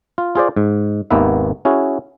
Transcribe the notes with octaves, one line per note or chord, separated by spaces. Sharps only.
F4
F4 G#4 C5 D5
G#2
G#1 D#2 A#3 B3 B4 E5
C#4 E4 F#4 G#4